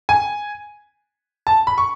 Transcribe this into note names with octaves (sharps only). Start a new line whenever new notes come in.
G#5
A5
B5
C#6